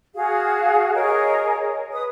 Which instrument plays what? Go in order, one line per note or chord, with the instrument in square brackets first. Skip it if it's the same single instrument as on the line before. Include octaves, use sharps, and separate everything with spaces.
[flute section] F#4 G#4 F5
G#4 A#4 C#5 D#5
B4 D#6